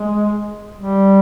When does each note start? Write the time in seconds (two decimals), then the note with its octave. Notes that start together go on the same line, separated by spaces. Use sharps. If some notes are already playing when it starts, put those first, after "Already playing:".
Already playing: G#3
0.76 G3